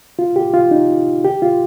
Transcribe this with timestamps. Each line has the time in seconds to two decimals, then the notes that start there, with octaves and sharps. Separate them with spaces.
0.19 F4
0.36 G4
0.54 F4
0.71 D#4
1.25 G4
1.42 F4